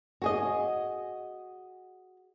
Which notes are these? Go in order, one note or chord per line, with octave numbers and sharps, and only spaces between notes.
F#4 G#4 D#5